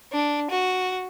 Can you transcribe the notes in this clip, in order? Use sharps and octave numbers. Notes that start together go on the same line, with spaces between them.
D4
F#4